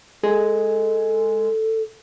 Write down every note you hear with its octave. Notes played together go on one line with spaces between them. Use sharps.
G#3 A4